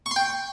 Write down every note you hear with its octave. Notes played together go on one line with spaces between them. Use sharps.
C#6
C6
G5